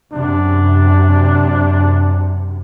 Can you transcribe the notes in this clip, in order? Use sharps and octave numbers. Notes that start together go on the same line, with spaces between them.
F#2 C3 D4